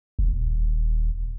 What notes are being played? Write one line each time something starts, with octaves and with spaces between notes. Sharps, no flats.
D#1